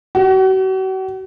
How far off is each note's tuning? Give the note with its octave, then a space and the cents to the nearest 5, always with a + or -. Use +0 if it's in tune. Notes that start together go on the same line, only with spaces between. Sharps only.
F#4 +40